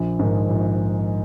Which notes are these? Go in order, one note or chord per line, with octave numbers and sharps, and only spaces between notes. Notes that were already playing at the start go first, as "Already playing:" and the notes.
Already playing: A#1
G#2 D#3
A#1